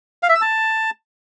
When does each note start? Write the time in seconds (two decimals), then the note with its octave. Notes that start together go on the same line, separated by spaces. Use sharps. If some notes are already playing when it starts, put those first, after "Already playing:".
0.23 F5
0.29 E5
0.35 E6
0.41 A5